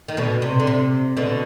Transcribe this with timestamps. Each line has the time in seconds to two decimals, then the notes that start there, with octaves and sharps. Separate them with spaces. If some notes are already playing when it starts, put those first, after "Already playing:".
0.08 D#3
0.17 B2 D3
0.42 C3
0.60 D3
0.67 C3
1.17 B2 D3